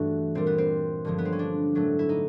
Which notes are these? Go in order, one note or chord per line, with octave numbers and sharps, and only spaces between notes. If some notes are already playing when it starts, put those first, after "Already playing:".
Already playing: G2 E3 A3 F#4
A#2 G3 C4
B3
C4
G2 D3 F3 G#3
B3
C4
C#4
D4
A2 F#3 A3
E4
D#4